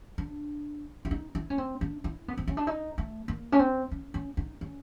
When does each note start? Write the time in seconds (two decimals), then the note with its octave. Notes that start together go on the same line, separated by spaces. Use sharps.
0.18 D4
1.05 E4
1.11 D#4
1.35 E4
1.50 C#4
1.58 C4
1.81 D4
2.04 E4
2.28 B3
2.38 C4
2.47 C#4
2.57 D4
2.67 D#4
2.98 A3
3.28 A#3
3.52 C#4
3.59 C4
3.91 C#4
4.14 C#4
4.37 D#4
4.61 C#4